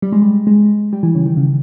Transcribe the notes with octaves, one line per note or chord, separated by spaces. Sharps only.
G3
G#3
G3
G#3
G3
E3
C#3
D#3
C#3